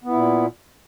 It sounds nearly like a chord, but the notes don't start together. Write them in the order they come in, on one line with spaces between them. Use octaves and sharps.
B3 E4 A#2